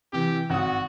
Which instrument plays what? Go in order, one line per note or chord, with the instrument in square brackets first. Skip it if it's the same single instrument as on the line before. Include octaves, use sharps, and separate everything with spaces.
[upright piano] C3 E3 [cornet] G4
[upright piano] G#1 D#6 [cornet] F#4